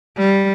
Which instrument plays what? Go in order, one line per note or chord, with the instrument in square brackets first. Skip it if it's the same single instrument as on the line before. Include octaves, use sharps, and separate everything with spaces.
[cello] G3